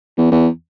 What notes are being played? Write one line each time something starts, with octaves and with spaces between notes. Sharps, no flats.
E2
E2